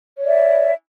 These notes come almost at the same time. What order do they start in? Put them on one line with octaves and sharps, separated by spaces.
C#5 D5 E5